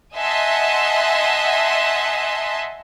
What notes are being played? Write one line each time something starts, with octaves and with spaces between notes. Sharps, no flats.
D#5 E5 F#5 G#5 A5 C6